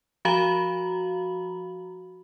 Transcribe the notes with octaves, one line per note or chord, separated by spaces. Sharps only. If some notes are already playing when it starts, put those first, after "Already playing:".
F3 F#4 F5 A#5 B5 F#7